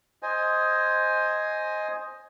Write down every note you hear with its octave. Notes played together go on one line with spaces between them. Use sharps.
C5 D#5 G#5